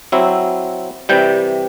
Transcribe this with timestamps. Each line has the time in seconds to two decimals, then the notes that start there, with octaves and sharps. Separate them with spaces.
0.12 F#3 C4 E4
1.09 C3 E3 G3 G5